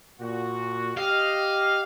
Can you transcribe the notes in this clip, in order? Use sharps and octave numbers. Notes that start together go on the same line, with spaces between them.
A#2 F#4
G4 D#5 F5